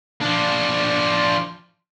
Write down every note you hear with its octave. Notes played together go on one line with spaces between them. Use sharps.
F3 D4